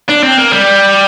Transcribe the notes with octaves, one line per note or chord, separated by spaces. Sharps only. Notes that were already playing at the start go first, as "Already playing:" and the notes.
D4
C4
A#3
G3